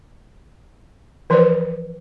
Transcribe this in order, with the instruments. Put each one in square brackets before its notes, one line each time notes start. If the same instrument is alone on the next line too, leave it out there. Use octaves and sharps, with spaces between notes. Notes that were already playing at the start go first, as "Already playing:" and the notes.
[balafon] E3 F3 B4 C5 D5